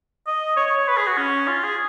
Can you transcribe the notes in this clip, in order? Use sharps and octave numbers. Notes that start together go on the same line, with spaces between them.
D#5
C#5
C#5
C#5
B4
G#4
F#4
C#4
F4
G#4